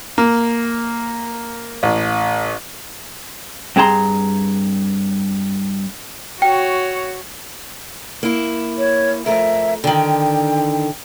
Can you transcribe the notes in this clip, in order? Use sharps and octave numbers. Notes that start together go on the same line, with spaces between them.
A#3
A1
G2 C4 G#4 A5 A#5 C6
F#4 C#5 G5
A#3 E4
C#5
F2 A3 A#4 E5
D3 D#3 G5